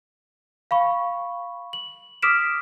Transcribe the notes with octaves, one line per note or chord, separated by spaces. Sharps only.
F5 B5 C#6
F#7
D6 D#6 F6 B6 D7 E7